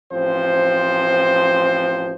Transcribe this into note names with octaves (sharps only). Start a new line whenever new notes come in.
A1 F3 C4 C5